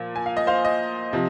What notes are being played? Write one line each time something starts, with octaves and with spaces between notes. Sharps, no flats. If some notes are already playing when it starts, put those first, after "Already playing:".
Already playing: A#2 F3
G#5
F5
D#5
C5 F5
D#5
C3 F3